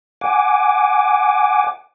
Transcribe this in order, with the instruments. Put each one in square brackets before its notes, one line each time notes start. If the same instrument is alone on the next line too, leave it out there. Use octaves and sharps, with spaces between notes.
[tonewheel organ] F#5 G#5 D6